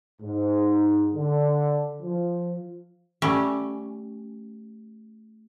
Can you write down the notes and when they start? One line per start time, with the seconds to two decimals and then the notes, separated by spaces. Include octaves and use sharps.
0.21 G#2
1.13 D3
2.01 F3
3.22 G3 A3 C#4